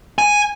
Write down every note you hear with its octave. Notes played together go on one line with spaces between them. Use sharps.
G#5